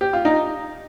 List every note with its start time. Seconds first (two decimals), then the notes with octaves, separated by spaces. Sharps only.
0.01 G4
0.13 F4
0.25 D#4